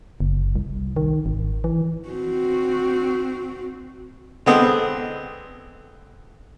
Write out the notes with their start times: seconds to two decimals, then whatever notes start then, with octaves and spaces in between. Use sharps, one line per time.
0.20 F#1
0.56 C2
0.96 D#3
1.26 G#1
1.64 E3
2.09 C4 F#4
4.46 D3 G#3 B3 C4